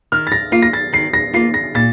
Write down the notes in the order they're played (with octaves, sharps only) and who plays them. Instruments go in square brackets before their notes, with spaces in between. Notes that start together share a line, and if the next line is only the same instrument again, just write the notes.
[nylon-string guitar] D#3 [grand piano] F6
[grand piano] A6
A#6
[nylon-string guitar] A#3 F4 [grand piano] C7
[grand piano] A#6
A6
[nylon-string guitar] D#3 [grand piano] C7
[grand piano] A#6
[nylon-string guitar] A#3 F4 [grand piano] C7
[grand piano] A#6
[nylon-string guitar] A#2 [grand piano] A6